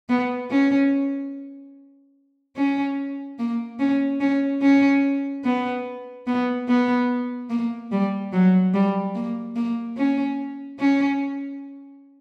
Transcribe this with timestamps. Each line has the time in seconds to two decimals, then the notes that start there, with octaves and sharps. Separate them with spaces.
0.09 B3
0.50 C#4
2.56 C#4
3.39 A#3
3.79 C#4
4.20 C#4
4.62 C#4
5.44 B3
6.27 B3
6.68 B3
7.50 A#3
7.92 G3
8.33 F#3
8.74 G3
9.15 A#3
9.56 A#3
9.97 C#4
10.79 C#4